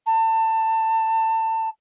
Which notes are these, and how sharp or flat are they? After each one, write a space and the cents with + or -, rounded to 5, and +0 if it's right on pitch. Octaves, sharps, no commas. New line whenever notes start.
A5 +25